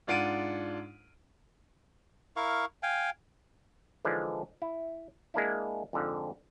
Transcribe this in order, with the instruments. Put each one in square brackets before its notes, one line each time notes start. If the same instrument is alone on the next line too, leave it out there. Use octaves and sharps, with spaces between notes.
[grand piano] G#2 D4 F4 F#5 D7 D#7
[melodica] E4 A#4 F5 C#6
F5 G5 G#5
[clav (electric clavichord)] D3 E3 F3 G#3 D4 D#4
E4
G#3 A#3 D4 E4
F2 G#2 D3 F3